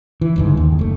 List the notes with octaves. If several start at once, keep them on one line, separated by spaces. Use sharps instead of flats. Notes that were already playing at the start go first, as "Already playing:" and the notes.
E3
G1 C#2 G#2
D#2
F#1 A3